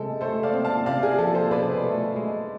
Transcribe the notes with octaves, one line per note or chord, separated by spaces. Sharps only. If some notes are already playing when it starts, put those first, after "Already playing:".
Already playing: C3 G#3 A4
A3 A4 C5
D5 F5
C4
F5 A5
C3 D5 F5
G#4
F3 A4
A4 C5
B2 B4 D5
A3
G#3